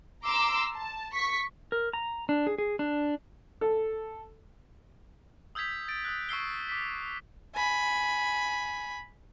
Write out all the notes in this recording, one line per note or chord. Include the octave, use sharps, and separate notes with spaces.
A#5 C6 D6 E6
A5
C#6 B6
A#4
A#5
D4
G#4
G#4
D4
A4
D#6 E6 G6 G#6 B6 F7
A6 D7
D#6 E6 F#6
C#6 E6 C7 G7
D6 B6
G#5 B5